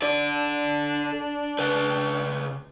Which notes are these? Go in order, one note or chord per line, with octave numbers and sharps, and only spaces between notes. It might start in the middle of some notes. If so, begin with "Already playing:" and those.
D4 A4 D5
C#3 B4